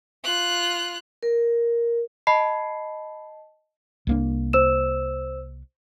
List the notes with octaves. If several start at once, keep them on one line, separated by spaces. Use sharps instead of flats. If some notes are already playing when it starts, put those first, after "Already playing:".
F4 F#6
A#4
D#5 A5 B5 C7
C2 A#3 D4
C5 E6 E7